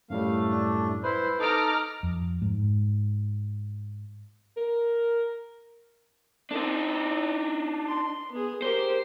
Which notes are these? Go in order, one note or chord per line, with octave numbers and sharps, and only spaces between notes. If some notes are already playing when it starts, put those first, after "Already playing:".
F#2 A2 G3 A3 F5
D4
E4 B4 C5
D#4 A4 A#5 D6 F6
F2
G#2
A#4
C4 D4 D#4
C6
B3 G#4
G4 A#4 C5